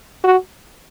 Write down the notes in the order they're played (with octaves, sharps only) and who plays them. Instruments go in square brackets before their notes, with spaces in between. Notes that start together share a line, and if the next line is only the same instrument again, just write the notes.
[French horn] F#4